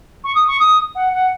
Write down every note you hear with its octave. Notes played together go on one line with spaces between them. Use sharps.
C#6
D#6
C#6
D#6
F#5
F#5